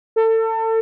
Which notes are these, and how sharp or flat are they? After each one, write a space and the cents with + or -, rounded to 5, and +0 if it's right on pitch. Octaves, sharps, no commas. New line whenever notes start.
A4 +30